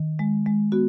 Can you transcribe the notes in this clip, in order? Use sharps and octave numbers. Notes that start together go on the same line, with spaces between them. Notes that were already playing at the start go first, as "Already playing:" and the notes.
Already playing: D#3
G#3
G#3
B3 F#4